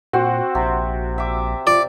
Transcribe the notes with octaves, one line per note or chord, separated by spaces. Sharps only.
A#2 C4 F#4
A#1 C3
E5 D6
F4 D5